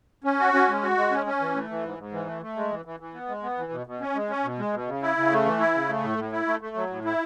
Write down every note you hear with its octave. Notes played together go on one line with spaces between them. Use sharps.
C#4
F#4
C#4
G#3
F#4
G#3
C#4
C#4
E3
A3
E3
G#2
G#2
E3
A3
A3
G#3
E3
E3
E3
B3
G#3
B3
E3
B2
B2
C#4
G#3
C#4
B2
G#3
B2
C#3
E4
C#3
A3
E3
E4
C#3
A3
A2
A2
E4
A3
A3
F#3
A2
E4